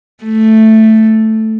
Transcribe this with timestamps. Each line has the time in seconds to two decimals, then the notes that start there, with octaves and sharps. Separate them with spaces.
0.24 A3